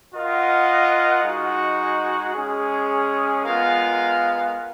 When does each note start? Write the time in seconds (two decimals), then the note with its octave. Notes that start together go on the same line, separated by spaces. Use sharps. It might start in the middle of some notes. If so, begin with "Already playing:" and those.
0.15 F4 A#4 D#5 F#5
1.24 G#3 D#4 F#4
2.35 G#3 C#4 G#4
3.45 G#3 B3 F4 A#4 F5